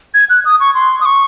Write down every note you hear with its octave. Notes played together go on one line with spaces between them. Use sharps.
G#6
F#6
D#6
C#6
C6
D#6
C#6